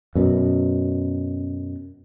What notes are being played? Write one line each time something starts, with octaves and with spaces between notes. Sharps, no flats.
F#2 B2